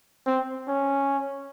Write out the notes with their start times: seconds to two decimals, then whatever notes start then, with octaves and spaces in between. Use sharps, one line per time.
0.27 C4
0.68 C#4